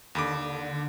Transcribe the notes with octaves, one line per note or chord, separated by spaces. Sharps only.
D#2 D3 B5 D6